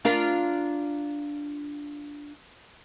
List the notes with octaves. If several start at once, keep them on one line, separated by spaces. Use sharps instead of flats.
D4 F4 A#4